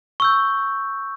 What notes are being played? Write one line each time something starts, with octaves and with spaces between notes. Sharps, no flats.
C#6 E6 G6